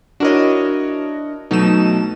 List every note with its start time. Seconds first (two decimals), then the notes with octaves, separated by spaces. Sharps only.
0.20 D4 E4 F#4 A#4 C#5 D#5
1.51 B2 F#3 A3 D#4 E7